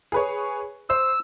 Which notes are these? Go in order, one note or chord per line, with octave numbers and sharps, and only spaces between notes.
G#4 B4 C#5
C5 E6